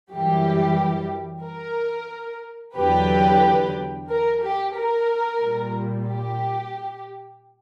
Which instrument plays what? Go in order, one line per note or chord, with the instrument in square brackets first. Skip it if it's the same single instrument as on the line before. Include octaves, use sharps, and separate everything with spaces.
[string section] F#2 E3 G3 G4
A#4
E2 D3 F#3 G4 B4
A#4
G4
A#4
A#2 G3
G4